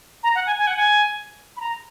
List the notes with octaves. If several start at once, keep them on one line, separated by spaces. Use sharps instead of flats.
A#5
F#5
G#5
G#5
F#5
G#5
B5
A#5